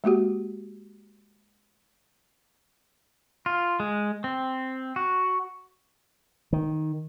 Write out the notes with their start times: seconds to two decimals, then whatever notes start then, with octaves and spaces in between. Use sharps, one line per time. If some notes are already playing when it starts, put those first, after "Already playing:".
0.04 G#3 A#3 F#4 G4
3.46 F4
3.80 G#3
4.24 C4
4.96 F#4
6.53 D#3